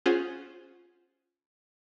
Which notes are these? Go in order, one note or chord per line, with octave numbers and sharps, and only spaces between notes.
C#4 F4 G#4 C5 F#5 G#5